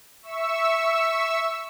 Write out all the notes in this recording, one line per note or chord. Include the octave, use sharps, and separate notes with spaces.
E5 C#6 E6